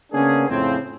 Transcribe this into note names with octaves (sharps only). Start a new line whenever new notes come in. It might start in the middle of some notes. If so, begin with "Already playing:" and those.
C#3 A#3 B3 C#4 D4 G#4
F2 A2 C#3 F3 C4